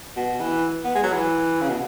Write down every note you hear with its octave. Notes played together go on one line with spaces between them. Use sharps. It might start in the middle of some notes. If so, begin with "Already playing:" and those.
B2
E3
B3
G#3
F#3
E3
C#3
B2